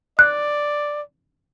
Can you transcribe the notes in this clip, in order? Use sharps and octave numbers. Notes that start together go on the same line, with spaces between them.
D5 F#6